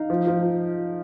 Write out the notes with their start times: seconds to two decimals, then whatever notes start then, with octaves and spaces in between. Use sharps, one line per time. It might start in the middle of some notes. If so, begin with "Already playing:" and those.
Already playing: D#4 F5
0.10 F3
0.27 F3